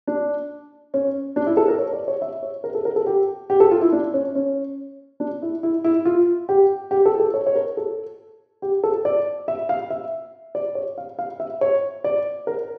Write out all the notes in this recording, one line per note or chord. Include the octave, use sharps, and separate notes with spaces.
D4
C#4
D4
E4
A4
A#4
C#5
D5
C#5
E5
C#5
A#4
A4
A#4
A4
G4
G4
A4
F4
E4
D4
C#4
C#4
D4
E4
E4
E4
F4
G4
G4
A4
A4
C#5
C#5
A#4
A4
G4
A4
D5
E5
F5
E5
D5
C#5
F5
F5
E5
C#5
D5
A#4